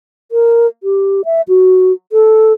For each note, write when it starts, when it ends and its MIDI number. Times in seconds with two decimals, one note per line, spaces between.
0.32 0.67 70
0.83 1.25 67
1.25 1.42 76
1.48 1.92 66
2.12 2.53 69